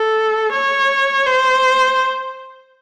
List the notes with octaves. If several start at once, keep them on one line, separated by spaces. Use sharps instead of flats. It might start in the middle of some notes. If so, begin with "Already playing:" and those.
Already playing: A4
C#5
C5